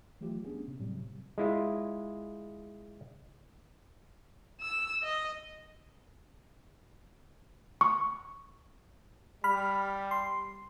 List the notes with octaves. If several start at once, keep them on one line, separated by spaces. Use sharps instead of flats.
E3 F#3 A3 F4 G4
B3 C#4 D4 G#4
C3
A2 C3 F#3 G3
G#3 E4 F4
E6
D#5
C#6
G3 B5 F6
C6